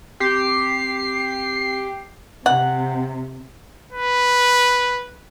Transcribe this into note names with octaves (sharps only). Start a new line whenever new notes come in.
C4 G4 C7
C3 F#5
B4